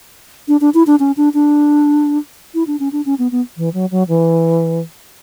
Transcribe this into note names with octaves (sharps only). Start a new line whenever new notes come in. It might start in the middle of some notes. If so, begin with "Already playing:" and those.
D4
D4
E4
D4
C#4
D4
D4
E4
D4
C#4
D4
C#4
B3
B3
E3
F#3
F#3
E3